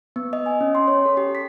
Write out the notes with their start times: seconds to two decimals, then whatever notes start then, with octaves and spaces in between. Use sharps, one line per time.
0.16 B3
0.33 D#5
0.46 G#5
0.61 C#4
0.75 C6
0.88 C#5
1.05 A4
1.17 G4
1.35 B6